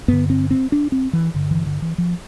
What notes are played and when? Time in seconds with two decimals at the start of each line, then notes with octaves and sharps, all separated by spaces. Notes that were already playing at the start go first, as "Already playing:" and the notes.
0.08 G2 D3 B3
0.30 C4
0.51 C4
0.72 D4
0.92 C4
1.13 E3
1.34 G2 D3
1.51 E3
1.66 D3
1.82 E3
1.98 F3